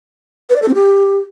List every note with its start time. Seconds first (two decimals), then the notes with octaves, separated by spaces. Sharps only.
0.50 B4
0.56 D5
0.62 A4
0.68 C4
0.74 G4